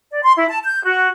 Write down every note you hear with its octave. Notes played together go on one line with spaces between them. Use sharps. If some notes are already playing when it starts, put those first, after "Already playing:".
D5
C6
E4
A5
G6
F#4